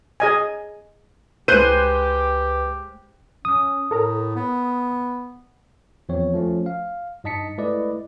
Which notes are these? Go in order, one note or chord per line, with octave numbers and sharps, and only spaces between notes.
G#4 D#5 G#5
C#2 G#3 G4 B4 C5 F#6 G6 D#7
C#4 D#6
A2 A4 A#4 A#5
B3
E2 F3 C4 C#5
F3 A3 C#4
F5
G2 D#4 D#5 A5 B6 C#7
G#3 A3 E4 B4 D5 D#5